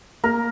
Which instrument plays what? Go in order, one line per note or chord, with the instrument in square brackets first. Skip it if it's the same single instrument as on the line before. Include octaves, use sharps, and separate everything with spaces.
[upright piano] A#3 [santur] A#4